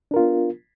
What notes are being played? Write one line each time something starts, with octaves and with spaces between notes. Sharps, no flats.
B3 D4 F4 A#4